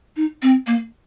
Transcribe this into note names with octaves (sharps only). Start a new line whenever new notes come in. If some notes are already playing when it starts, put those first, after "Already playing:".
D#4
C4
A#3